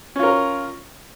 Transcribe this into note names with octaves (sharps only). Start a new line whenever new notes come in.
C#4 F4 A#4